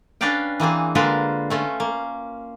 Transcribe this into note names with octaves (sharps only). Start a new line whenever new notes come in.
C#4 D4 B4 D5 F5 G5
E3 A#3 C4 G#4
D3 G#3 A#3 F4 A#4 B4
A3 C#4 F4
A#3